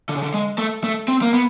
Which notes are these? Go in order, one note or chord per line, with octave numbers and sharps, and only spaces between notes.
D3
C#3
D3
G#3
A3
A3
C4
A#3
B3